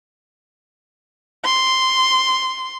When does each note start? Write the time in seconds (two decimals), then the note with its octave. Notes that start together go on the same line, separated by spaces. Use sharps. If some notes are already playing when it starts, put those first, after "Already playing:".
1.45 C6